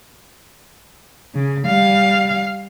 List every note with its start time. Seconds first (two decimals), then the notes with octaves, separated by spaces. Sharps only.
1.35 C#3
1.67 G3 F5